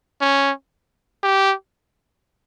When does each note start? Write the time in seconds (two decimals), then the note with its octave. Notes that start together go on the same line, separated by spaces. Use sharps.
0.21 C#4
1.23 G4